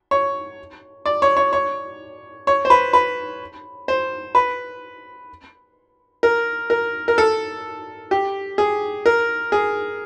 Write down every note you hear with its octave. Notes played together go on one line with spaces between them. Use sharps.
C#5
D5
C#5
C#5
C#5
C#5
C5
B4
B4
C5
B4
A#4
A#4
A#4
A4
G4
G#4
A#4
G#4